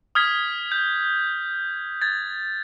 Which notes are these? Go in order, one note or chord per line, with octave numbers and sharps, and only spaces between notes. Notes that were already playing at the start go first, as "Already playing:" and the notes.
D#6 F6 G#6 B6
G6
G#6 A6